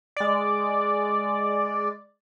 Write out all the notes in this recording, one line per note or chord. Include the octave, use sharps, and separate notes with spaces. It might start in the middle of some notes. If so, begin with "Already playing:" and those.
G#3 D5